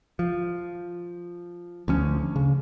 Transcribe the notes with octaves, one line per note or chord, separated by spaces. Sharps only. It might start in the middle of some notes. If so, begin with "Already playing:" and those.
F3
D2 F3 C#4
C#3